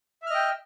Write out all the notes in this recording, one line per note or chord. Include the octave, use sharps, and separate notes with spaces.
D#5 E5 G5 F6